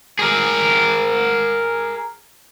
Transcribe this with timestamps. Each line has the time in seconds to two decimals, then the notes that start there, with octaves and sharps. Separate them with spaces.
0.19 G#4 A#4